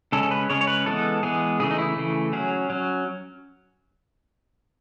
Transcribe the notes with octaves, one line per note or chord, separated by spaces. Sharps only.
C#3 G#3 C#4 A4
B4
C#3 G#3 C#4 C#5
C#5
B4
E3 G#3 B3 A4
E3 G#3 B3 G#4
C#3 E3 A3 G#4
D#4
E4
C#3 E3 A3
F#3 C#4 G#4
F#3 C#4